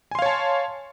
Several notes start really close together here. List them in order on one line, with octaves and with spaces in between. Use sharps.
G#5 C6 F5 C#5 A5